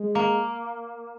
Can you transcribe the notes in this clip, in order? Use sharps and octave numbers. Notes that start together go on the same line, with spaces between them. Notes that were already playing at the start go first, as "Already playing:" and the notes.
Already playing: G#3
A#3